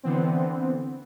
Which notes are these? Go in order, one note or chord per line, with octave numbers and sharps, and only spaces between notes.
D3 E3 B3 C4